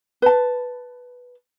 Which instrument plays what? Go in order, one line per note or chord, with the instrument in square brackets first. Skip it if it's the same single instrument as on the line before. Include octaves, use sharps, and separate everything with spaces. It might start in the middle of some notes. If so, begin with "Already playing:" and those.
[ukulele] B4 A5